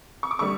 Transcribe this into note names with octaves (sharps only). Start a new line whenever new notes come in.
C#6
D6
D3 G3 C#6 E6